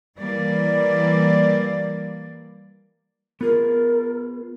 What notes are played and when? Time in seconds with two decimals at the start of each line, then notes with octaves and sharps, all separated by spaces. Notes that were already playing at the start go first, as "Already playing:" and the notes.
0.18 E3 G3 A#3 D5
3.41 B3 F4 G#4 A#4